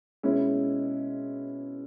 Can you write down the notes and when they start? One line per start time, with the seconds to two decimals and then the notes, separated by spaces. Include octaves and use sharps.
0.23 B2 G#3 C#4 E4